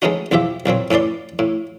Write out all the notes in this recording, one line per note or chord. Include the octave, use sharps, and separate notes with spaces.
G#3 A3 B3 C#4 D#4 F#4
B1 E2 F3 G4 E5
B1 A#2 F#3 C4
A2 C#4 B4 D5 C6
A2